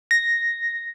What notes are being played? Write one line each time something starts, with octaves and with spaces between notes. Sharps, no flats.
A#6